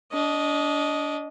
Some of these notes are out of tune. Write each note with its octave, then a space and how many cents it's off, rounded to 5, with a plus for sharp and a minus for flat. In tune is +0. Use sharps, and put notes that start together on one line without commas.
D4 -30 D#5 +0